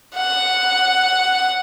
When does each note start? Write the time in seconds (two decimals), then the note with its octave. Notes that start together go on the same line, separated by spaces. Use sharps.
0.16 F#5